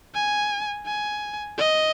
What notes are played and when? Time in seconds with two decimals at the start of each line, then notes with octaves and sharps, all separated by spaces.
0.15 G#5
0.86 G#5
1.58 D#5